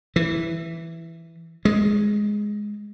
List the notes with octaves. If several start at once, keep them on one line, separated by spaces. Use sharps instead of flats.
E3
G#3